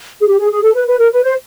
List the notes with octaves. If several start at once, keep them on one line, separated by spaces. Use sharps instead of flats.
G#4
G4
G#4
G#4
A4
B4
B4
A#4
B4
C5